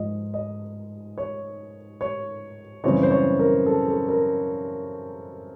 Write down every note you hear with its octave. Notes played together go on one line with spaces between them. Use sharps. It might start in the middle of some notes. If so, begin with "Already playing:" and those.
Already playing: G#2 F3 D#5
D#5
C#5
C#5
F#2 C#3 E3 G3 C4 C#5
C5
C#5
A#4
A4
A4
A#4